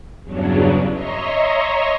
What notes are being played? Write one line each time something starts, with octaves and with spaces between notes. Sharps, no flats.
E2 G2 C#3 F#3 C#4 D4
C#5 D#5 E5 A#5 C6 C#6